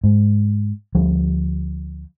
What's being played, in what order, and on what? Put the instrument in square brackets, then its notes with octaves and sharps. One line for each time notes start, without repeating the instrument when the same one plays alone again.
[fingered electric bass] G#2
D2 F3 G3